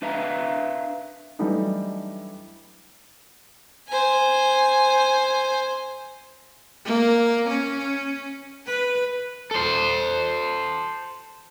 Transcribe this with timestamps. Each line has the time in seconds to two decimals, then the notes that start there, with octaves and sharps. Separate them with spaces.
0.02 D4 B4 E5 F5 A5 A#5
1.39 E3 F#3 G3 A3 D4 D#4
3.88 C5 G#5
6.85 A#3
7.49 C#4
8.66 B4
9.51 A4 C5